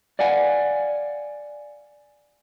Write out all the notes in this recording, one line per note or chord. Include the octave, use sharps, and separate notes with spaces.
D5 F5 F#5 G#5